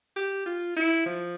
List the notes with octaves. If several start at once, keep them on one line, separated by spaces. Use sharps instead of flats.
G4
F4
E4
F3